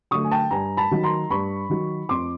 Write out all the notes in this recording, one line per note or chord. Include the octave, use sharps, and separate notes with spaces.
D3 F#3 A3 C#6 D#6
G#5
G5 A5
G2 G#5 A#5
A5 B5
D#3 F#3
A#5 C6
G2 B5 C#6
D#3 F#3
F2 C6 D6